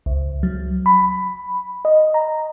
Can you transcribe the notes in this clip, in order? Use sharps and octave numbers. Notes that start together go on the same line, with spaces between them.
C#2
F#3
B5
D#5
A#5